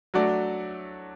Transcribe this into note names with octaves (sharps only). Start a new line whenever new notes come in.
F#3 A3 D4 F#4 D5